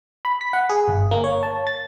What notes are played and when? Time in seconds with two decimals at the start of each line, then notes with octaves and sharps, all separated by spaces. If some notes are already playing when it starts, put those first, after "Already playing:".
0.25 B5
0.41 B6
0.53 F#5
0.69 G#4
0.88 G1
1.11 A#3
1.24 C#5
1.43 A5
1.67 A6